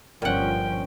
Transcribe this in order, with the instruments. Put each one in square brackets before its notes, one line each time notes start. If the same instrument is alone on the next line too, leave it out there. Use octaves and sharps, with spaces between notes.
[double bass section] G1 F3 C#4 [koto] A#2 F#5 [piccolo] G5